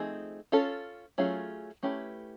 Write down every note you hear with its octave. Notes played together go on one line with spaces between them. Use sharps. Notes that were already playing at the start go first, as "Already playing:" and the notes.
Already playing: F3 A3 C4 D#4 G#4
C#4 F4 A4
F#3 A3 C#4 F4 G#4
A3 C#4 E4 G4 B4